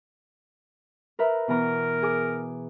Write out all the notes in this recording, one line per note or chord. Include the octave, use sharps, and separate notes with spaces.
A#4 B4 E5
B2 E3 A#4 A#5
G#4 D6